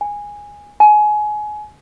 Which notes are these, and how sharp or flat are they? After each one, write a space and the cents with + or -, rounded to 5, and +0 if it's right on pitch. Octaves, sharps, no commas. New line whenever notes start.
G#5 -10
G#5 +25